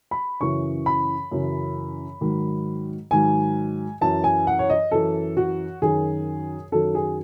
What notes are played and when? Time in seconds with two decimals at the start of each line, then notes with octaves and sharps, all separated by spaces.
0.11 B5
0.41 F#2 C#3 E3 C#6
0.86 B5
1.31 F#2 C#3 E3
2.21 G#2 D#3 F#3
3.11 G#2 D#3 F#3 G#5
4.01 F#2 E3 A5
4.24 G#5
4.47 F#5
4.59 C#5
4.70 D#5
4.91 F#2 E3 A4
5.37 F#4
5.82 F#2 D#3 F#3 G#4
6.72 F#2 D#3 F#3 A4
6.95 G#4